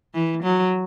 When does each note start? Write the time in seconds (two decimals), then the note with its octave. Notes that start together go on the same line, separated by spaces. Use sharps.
0.14 E3
0.44 F#3